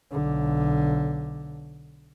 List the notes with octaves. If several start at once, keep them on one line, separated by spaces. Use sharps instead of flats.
B1 D3